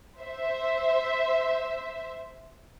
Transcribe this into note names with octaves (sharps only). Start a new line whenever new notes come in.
C5 E5